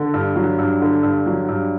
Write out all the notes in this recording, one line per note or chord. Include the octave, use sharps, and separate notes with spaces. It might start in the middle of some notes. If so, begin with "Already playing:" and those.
Already playing: D3
G2
F#3
G2
D3
G2
F#3
G2